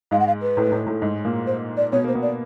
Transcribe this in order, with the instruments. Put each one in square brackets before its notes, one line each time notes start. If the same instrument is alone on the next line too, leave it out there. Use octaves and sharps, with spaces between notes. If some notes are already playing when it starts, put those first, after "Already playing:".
[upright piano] G#2 G#3 [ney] F5
[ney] F#5
F5
B4
[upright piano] A2 A3
A2 A3
A2 A3
G#2 G#3
A#2 A#3
[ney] C5
D5
[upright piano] B2 B3 [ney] C#5
[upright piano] A#3 [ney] C5
[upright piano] B2 B3
[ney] D5